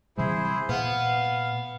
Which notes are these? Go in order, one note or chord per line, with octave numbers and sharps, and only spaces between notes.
C3 E3 G3 E4 G#4 C5
A#2 B3 F5